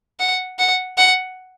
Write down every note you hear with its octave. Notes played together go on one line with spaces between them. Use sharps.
F#5
F#5
F#5